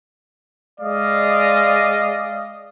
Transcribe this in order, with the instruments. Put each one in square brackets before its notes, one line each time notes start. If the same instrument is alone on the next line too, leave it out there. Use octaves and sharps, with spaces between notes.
[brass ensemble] G#3 D5 D#5 F5